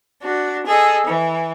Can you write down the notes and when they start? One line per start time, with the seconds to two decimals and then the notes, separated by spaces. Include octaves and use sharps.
0.22 D4 F#4
0.65 G#4 A4 D#5
1.06 E3